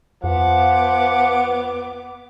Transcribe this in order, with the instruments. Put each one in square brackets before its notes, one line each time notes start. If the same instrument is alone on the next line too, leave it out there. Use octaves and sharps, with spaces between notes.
[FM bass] F2 [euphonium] F3 [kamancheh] B3 D6 [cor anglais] F#5